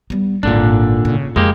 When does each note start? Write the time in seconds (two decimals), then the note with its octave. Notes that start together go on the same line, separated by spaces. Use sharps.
0.10 G3 B3
0.43 G#1 D#2 A#2 D3 D4
1.05 C#3
1.36 F2 G#3 A#3 G4